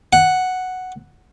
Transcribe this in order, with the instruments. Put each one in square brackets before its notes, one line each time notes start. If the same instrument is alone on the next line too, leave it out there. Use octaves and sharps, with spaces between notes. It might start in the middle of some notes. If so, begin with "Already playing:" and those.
[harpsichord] F#5